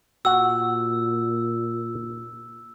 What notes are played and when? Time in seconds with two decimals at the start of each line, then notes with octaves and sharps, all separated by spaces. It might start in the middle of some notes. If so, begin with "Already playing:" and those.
0.25 A#2 F#4 F#5 E6